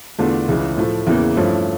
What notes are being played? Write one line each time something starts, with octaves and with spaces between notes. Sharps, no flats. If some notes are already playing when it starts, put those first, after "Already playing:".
E2 D3 A3 D4 F4
C#2 C#3 E3
A2 F3 A3
E2 C#3 E3 A#3
G2 F3 A3 C#4 E4